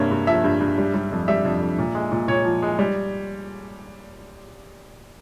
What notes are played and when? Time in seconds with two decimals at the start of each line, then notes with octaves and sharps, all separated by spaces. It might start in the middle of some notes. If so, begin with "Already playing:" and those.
Already playing: G2 C3 A#3 C#5
0.11 G2
0.27 F3 E5
0.44 G2
0.61 G2
0.78 G3
0.94 G3
1.12 F2
1.28 G3 E5
1.45 F2
1.61 F2
1.79 A#2
1.95 G#3
2.12 A#2
2.28 A#2 C#5
2.45 F3
2.62 G#3
2.79 G3